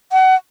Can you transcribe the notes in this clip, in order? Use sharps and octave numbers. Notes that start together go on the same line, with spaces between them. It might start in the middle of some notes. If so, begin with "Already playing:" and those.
F#5